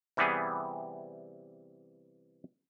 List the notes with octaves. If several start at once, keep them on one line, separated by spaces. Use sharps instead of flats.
C3 E3 G3 B3 G#4